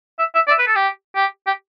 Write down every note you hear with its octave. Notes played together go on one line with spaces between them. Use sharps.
E5
E5
D5
E5
B4
A4
G4
G4
G4